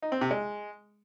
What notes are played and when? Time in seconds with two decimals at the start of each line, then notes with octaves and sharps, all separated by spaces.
0.02 D#4
0.12 C4
0.21 C3
0.31 G#3